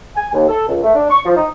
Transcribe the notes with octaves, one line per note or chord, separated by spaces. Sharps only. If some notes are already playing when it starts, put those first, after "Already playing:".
G#5
D#2
A4
C#2
A3
D4
C#6
F3
D#4